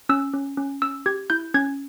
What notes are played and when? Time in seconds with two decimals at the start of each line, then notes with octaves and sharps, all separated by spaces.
0.09 C#4 E6
0.34 C#4
0.57 C#4
0.82 C#4 E6
1.06 G4 G#6
1.30 E4 G6
1.54 C#4 G#6